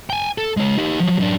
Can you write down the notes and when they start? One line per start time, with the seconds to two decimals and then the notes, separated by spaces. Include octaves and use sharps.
0.10 G5 G#5
0.38 A4
0.57 G#3 C#5
0.78 D#4 G4
1.00 F3 F#3
1.20 F#2 D4